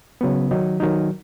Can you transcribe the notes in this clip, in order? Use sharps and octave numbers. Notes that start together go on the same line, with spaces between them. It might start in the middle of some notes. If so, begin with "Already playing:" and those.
C#3 F#3 B3
D#3 F#3 D#4
D#3 F#3 D#4